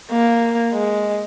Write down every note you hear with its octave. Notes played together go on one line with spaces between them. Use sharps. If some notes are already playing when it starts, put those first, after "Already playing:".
A#3
G#3